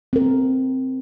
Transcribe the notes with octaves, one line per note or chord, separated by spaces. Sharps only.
C4 A#4